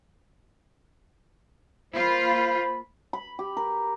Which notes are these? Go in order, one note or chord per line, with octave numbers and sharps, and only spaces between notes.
A#3 F4 C5 B5
B5
G4
A#4